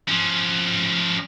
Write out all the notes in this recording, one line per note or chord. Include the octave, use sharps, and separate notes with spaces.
F3 C#4